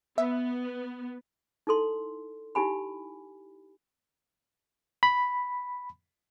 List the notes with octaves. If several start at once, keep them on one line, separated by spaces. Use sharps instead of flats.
B3 E5
D#4 E4 A4 C6
D#4 E4 G4 G#5 B5
B5